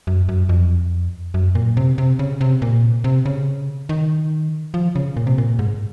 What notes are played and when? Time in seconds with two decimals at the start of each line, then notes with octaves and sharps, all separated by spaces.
0.07 F#2
0.29 F#2
0.49 F2
1.34 F#2
1.55 A#2
1.77 C3
1.98 C3
2.19 C#3
2.41 C3
2.62 A#2
3.04 C3
3.25 C#3
3.89 D#3
4.74 F3
4.95 C#3
5.17 A#2
5.27 C3
5.38 A#2
5.59 G#2